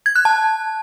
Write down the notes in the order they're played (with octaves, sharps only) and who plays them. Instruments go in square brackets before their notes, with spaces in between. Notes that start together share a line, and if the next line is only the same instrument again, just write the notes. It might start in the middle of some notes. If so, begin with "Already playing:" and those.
[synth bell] G#6
F#6
A5